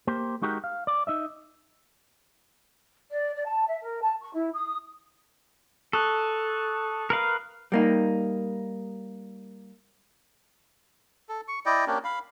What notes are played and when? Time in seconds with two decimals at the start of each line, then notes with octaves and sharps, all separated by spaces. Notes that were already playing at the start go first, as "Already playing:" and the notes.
0.07 A#3 G4 C5
0.42 G#3 D#4 F#4 G4 A#4
0.64 F5
0.87 D5
1.07 D#4 D#5 E5
3.11 D5
3.33 D5
3.45 A5
3.67 E5
3.80 A#4
4.01 A5
4.20 C#6
4.33 E4
4.53 D#6
5.93 A4 C#6 D#6 F#6
7.10 A#4 B4 F5
7.72 G3 A#3 D#4
11.29 A4
11.48 C#6
11.66 E4 D5 D#5 G5
11.87 A#3 C#4 D4 G4
12.04 F5 B5